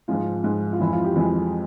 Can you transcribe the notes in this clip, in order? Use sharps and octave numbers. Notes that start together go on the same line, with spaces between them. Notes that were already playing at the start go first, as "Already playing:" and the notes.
G#2 F3 G#3 F4
G#2 F3 G#3
F4
F2 E3 G#3 E4
F4
G4
F2 E3 G#3